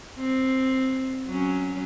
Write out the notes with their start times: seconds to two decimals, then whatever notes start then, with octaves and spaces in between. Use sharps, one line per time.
0.19 C4
1.27 F#3 C#4